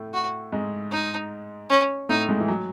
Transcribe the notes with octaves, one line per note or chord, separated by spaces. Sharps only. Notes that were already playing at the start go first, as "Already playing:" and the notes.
Already playing: A2 A3
F#4
G#2 G#3
D#4
C#4
A2 A3 D#4
G#2 G#3
E3
F#3